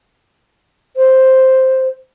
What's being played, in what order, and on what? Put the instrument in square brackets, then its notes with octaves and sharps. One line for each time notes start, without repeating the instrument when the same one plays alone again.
[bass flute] C5